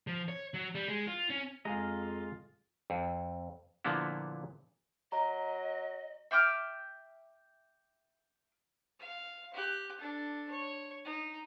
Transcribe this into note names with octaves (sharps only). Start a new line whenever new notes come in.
F3
C#5
F#3
G3
G#3
F4
C#4
F2 G#3 F4 G#4 D#5 F5 A#5
F2
A#2 D3 F3 A#3 B3 E4
F#3 D#5 A#5
E5 G5 D6 F6
F5
G4 F#6
D4 A4
C#5
D#4